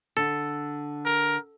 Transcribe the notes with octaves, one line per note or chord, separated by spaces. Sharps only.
D3 A4
A#4